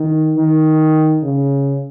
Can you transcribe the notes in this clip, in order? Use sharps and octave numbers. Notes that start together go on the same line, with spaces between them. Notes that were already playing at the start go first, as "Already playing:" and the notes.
Already playing: D#3
D#3
C#3